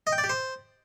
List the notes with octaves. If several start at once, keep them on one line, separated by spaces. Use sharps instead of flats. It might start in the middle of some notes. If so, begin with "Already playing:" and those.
D#5
G5
D5
G4
C5